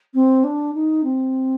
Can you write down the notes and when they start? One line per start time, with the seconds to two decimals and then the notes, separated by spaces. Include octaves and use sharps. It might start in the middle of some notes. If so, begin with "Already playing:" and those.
0.14 C4
0.44 D4
0.75 D#4
1.04 C4